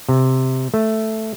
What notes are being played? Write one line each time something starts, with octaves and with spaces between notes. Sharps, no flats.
C3
A3